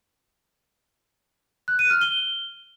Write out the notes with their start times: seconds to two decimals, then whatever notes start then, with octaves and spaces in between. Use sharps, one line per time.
1.68 F#6
1.79 D#7
1.90 F6
2.01 G7